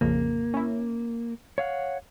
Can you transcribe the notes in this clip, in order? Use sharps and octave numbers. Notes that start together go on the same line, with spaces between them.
A#1 F2 C#3 A#3
C#4 E4
C#5 F5 F#5